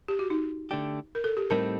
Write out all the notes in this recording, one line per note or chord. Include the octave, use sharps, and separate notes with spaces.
G4
F#4
D#4
D3 A3 D4 G4
A#4
A4
G4
A2 G3 C4 D#4 A4 A#4